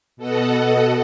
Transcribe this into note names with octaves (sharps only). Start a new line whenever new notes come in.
B2 A4 D#5 F#5